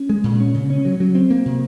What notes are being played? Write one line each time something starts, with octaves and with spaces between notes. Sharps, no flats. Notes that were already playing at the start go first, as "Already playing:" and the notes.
Already playing: C#4
G#3
A#2
C#4
C#3
C#4
F#3
F#3
C4
A#3
C3